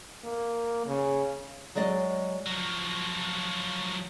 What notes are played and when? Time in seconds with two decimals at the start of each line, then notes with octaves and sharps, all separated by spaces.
0.24 A#3
0.86 C#3
1.75 F#3 G#3 D5 D#5
2.46 F3 F#3